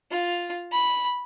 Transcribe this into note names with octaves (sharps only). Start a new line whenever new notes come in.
F4
B5